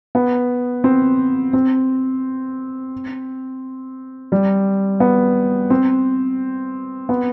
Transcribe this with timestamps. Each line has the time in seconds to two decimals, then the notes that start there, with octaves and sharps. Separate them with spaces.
0.15 B3
0.84 C4
1.53 C4
4.32 G3
5.00 B3
5.70 C4
7.09 B3